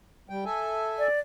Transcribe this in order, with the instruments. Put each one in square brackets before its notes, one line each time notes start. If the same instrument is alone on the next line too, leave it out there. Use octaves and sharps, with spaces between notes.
[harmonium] G3 G5
A4 E5 G#5
[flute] D5